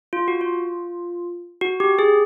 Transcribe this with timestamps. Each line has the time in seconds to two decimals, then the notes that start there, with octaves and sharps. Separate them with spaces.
0.13 F4
0.28 F#4
0.41 F4
1.61 F#4
1.80 G4
1.99 G#4